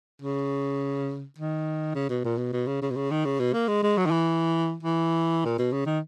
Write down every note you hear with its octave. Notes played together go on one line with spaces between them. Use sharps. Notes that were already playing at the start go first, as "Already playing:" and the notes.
C#3
D#3
C#3
B2
A#2
B2
B2
C#3
C#3
B2
C#3
D#3
C#3
B2
A#3
G#3
G#3
F#3
D#3
E3
E3
A#2
B2
C#3
D#3